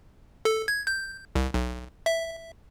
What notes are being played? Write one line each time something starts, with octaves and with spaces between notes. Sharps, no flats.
A4
G#6
G6
C2
B1
E5